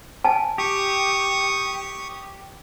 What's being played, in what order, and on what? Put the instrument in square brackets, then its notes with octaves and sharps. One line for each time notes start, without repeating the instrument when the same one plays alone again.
[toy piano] G#5 A5
[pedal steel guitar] G4 [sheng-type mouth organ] C#6 D#6